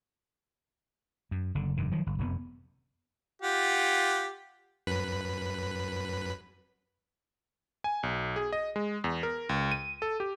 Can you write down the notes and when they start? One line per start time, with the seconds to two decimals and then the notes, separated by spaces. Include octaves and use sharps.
1.31 F#2
1.55 F#1 D3
1.77 F1 G2 D#3
1.91 D#3 F3 F#3
2.06 G1
2.18 F1 F#2 C3 B3
3.42 F4 G4 F#5
4.87 F#2 B4 B5
7.84 G#5
8.03 B1
8.36 G#4
8.52 D#5
8.76 G#3
9.04 E2
9.23 A#4
9.49 C#2
9.72 D#7
10.02 A4
10.20 G4